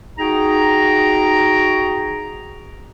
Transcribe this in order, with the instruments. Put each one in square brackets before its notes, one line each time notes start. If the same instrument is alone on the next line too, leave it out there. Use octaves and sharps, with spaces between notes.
[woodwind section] D#4 F#4 G#4 G5 A#5